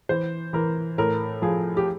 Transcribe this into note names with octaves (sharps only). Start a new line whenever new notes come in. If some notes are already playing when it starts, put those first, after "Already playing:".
E3 C5
E3 A#4
A2 A#4
F3 G#4
G4